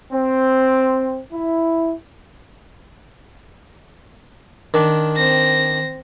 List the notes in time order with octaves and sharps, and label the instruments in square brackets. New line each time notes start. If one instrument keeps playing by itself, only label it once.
[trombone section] C4
E4
[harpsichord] D#3 D4
[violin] C4 A#6